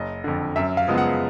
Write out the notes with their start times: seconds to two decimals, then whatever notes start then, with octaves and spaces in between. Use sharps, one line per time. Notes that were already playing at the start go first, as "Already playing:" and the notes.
Already playing: F#1 D#5
0.24 F2 D3
0.56 F#2 E5
0.77 F5
0.88 C#3 F3 G#3 B3
0.98 F#5